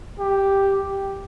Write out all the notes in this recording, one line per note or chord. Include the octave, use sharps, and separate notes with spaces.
G4